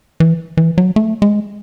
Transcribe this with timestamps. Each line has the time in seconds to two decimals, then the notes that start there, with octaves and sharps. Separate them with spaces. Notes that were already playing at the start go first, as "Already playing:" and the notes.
0.20 E3
0.57 E3
0.78 F#3
0.96 A3
1.22 G#3